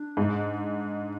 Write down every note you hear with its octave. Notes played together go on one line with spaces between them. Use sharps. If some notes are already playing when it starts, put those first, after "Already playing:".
Already playing: D4
G#2